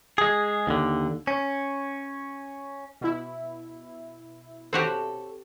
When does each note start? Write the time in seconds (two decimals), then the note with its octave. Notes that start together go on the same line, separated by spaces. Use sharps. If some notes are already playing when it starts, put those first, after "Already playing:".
0.18 G#3 G#4
0.67 D#2 D3
1.27 C#4
3.01 B2 E4
4.73 C4 F#4 G4 A4 C#5